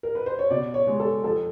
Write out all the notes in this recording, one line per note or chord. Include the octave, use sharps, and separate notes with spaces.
A#4
B4
C5
C#5
B2 D5
C#5
G#3
A4
F2 A4